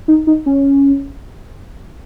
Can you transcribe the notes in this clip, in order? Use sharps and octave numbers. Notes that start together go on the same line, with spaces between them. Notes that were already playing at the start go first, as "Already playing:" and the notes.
D#4
D#4
C#4